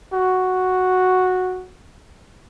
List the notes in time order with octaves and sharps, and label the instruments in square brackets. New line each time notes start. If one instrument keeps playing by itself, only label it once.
[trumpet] F#4